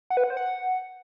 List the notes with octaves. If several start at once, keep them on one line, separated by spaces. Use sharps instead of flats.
F#5
B4
F#5
C5
F#5